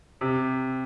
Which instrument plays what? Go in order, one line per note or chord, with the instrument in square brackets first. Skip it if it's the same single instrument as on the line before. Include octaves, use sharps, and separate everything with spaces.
[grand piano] C3